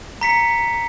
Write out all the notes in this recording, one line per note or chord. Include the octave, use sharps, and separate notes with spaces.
A#5 B6 C#7